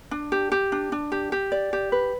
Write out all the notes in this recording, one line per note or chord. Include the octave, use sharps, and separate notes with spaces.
D4
G4
G4
D4
D4
G4
G4
D5
G4
B4